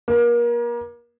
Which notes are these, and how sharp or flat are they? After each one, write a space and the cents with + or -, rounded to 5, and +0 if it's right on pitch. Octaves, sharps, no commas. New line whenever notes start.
A#3 +35